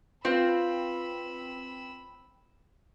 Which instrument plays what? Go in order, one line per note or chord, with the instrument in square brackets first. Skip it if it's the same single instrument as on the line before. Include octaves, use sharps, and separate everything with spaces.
[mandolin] C4 [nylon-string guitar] F4 B4 F5 [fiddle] B5 E6